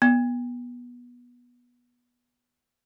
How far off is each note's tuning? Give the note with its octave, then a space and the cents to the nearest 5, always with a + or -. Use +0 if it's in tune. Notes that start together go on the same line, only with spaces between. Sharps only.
B3 -20